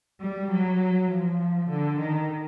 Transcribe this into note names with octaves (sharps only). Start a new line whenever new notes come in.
G3
F#3
F3
D3
D#3